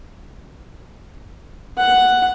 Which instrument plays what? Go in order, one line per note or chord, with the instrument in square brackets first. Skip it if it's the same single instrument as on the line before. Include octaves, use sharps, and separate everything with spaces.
[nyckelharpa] F#5